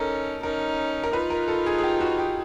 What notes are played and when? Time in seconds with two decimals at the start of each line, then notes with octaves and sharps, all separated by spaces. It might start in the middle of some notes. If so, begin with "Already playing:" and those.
Already playing: C#4 D#4 A4 A#4
0.43 C#4 D#4 A#4
1.04 A#4
1.13 D#4 F4 B4
1.30 A#4
1.48 A4
1.66 G#4
1.78 G#4
1.83 G4
2.00 F#4
2.18 G4